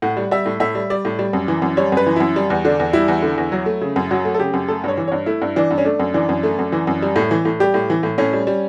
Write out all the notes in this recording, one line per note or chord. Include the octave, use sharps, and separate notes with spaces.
A2 F#5
G3
G3 E5
A2
A2 E5
G3
G3 D5
A2
G3
F#2
E3
F#2
G3 C#5
F#2 B4
E3
F#2 E4
G3
E2
D3 D4
E2
G3 E4
E2
D3
E2
F#3
A3
C#3
F#2
F#3 F#4
A3
A4
C#3 G4
F#2
A3 A4
G2 C#5
E3
G2 C#5
A3 E4
G2
E3 D4
G2
C#4
A3 D4
F#2
E3 D4
F#2
A3
F#2
E3
F#2
G3
A2
E3
A2
G3 G4
A2
E3
A2
A2 C#4
G3
G3